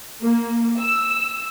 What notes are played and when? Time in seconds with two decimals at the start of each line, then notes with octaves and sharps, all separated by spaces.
0.23 A#3
0.80 E6